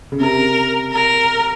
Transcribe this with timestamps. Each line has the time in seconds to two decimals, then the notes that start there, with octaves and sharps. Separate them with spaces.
0.12 C#3
0.20 C3 A#4
0.92 A#4